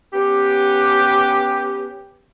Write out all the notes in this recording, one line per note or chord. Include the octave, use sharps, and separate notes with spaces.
B3 C#4 G4